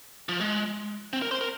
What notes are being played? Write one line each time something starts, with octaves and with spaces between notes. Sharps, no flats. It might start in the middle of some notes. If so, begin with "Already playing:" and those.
F3
G#3
C4
A#4
C5
A#4